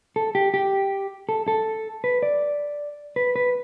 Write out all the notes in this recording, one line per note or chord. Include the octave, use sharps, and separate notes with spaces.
A4
G4
G4
A4
A4
B4
D5
B4
B4